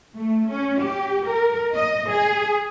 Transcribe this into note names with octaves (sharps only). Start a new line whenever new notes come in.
A3
C#4
G4
A#4
D#5
G#4